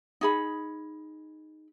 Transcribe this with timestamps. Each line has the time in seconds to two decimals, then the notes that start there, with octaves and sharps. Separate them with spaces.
0.21 D#4 G#4 B5